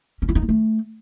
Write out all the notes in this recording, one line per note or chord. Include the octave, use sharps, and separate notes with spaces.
C#4
E4
D#4
A#3
A3